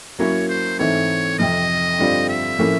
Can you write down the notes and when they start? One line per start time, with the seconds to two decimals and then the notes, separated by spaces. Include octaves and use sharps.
0.19 F#3 A#3 C#4 E4 C#5
0.49 C5
0.79 G#2 E3 A3 C4 D#4 C#5
1.38 F2 C3 F3 D#5
1.98 G2 D3 G3 C4 F4
2.29 E5
2.59 A2 F3 A#3 C#4 E4